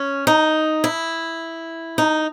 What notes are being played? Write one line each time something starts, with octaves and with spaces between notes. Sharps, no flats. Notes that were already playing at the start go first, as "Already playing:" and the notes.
Already playing: C#4
D#4
E4
D#4